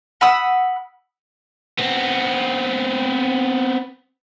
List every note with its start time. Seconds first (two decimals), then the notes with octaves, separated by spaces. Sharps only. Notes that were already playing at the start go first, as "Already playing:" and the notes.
0.21 F#5 B5 D#6 E6
1.78 B3 C4